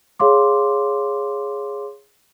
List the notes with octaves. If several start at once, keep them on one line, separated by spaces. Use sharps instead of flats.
G#4 C#5 F5 C6 D6